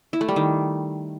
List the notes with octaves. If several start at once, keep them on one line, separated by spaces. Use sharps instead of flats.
E4
A3
G3
D#3